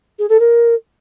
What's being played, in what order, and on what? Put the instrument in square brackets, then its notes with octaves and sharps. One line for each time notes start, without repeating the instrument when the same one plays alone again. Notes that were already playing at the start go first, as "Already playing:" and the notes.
[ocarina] G#4
A4
A#4